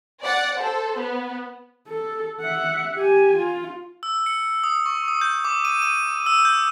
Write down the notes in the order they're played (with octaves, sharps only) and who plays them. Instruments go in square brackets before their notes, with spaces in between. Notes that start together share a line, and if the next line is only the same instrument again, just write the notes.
[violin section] D5 F#5
A4 C5
B3
[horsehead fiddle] A4
E5 F#5
G4 G#5
F4
[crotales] E6
C#7
D#6
C#6
D#6
G6
D6
D#7
D#7
E6
G6